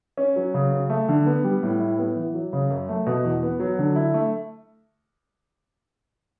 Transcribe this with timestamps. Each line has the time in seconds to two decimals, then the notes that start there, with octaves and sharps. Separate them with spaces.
0.17 C#4
0.36 F#3
0.54 C#3
0.72 C#4
0.90 A3
1.09 D3
1.26 B3
1.44 G3
1.63 A2
1.80 E4
1.99 B3
2.16 E3
2.34 F#3
2.53 C#3
2.70 F#2
2.89 A3
3.06 B2
3.24 E2
3.43 B3
3.60 F#3
3.79 D3
3.96 E4
4.14 A3